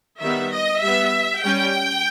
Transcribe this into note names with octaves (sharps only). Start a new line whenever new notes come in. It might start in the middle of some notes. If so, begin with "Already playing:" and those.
D#3 G3 B3 E5
D#5
G3 B3 E5
G3 C#4 G5